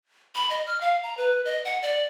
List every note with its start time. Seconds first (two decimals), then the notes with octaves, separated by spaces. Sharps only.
0.35 B5
0.50 D#5
0.67 F6
0.81 F5
1.03 A#5
1.17 B4
1.45 D#5
1.65 F#5
1.82 D5